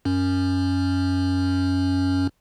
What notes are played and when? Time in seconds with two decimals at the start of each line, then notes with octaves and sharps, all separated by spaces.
0.05 F#2 C#4